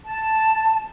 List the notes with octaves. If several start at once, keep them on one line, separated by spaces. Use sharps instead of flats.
A5